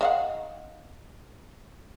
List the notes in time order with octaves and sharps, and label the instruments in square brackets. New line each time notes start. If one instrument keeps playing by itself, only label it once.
[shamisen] D#3 F5 F#5